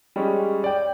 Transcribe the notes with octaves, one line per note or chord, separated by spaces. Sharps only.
G3 G#3 C#4
D5 G5